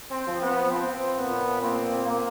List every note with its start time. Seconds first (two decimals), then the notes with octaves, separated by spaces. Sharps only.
0.11 C4
0.26 F3
0.42 B3
0.71 F3 C4
1.16 A#2 B3
1.61 A#3 C4
2.06 A#3